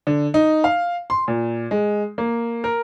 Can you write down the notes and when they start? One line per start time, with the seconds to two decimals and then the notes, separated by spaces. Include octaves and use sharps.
0.07 D3
0.34 D#4
0.64 F5
1.10 C6
1.28 A#2
1.71 G#3
2.18 A#3
2.64 A#4